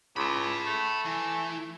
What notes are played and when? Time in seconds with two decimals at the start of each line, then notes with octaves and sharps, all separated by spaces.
0.16 C#2 A5 B5
0.66 A3
1.05 E3